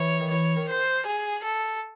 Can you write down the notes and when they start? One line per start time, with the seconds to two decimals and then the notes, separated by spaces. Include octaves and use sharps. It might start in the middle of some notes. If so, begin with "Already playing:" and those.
Already playing: E3 C#5
0.20 D#3
0.30 E3 C#5
0.56 D#3
0.69 C5
1.06 G#4
1.43 A4